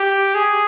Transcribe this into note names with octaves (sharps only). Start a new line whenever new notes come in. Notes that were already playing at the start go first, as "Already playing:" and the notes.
Already playing: G4
G#4